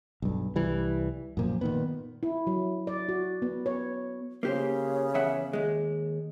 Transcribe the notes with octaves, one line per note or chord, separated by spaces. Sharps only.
B1 G2
C2 E3 G3
F#2 A#2 F3
A#2 D#3 B3
E4
F#3
D5
F#4
B3
C#5
C#3 A#3 G4 C5
E2 E5 F#5
D#2 G#3